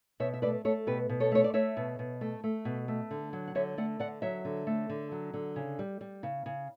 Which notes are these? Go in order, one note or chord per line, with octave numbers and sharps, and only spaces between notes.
B2 C#5 E5
E5
A3 B4 D5
A3 A4 C#5
B2 G4 B4
B2
A4 C#5
A3 C#5
D5
A3 C#5 E5
B2
B2
A3
A3
B2
A3
D3
F#3
F#5
D3 C#5 E5
A3 D5 F#5
D3 D5 F#5
F#3 C#5 E5
D3
A3
D3
F#3
D3
C#3
G3
G3
C#3
C#3